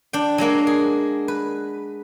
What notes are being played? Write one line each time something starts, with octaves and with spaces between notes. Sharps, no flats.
D4 G5
F#3 G#3 A#3 F#4
G#4
B4